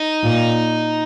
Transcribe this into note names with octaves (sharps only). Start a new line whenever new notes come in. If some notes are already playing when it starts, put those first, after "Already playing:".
Already playing: D#4
A#2